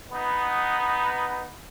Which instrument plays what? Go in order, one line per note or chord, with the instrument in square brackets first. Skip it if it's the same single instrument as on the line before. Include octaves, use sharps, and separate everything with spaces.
[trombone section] B3 D#4